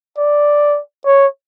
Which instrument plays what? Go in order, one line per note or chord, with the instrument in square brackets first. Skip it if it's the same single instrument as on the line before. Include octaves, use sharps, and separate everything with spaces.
[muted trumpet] D5
C#5